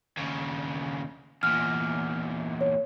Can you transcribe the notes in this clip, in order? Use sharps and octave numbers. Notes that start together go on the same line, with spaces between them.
D#2 C#3
E2 A#2 F6
C#5